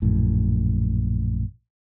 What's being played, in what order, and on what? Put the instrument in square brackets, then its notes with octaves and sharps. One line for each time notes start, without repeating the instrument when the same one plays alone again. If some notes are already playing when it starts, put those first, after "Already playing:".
[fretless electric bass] A#1 F#2 A2